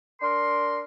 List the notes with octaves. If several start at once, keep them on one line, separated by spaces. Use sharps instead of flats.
D4 A#4 C6